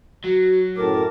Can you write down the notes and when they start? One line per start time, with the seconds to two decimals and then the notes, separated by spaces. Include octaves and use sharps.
0.24 F#3 F#4
0.76 F#2 A2 A#4 A5 D6